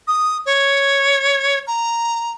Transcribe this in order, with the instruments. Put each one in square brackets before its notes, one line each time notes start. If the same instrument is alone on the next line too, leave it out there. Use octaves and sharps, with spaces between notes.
[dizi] D#6
C#5
A#5